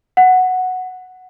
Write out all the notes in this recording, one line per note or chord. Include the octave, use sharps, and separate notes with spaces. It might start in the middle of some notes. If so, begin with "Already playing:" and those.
F#5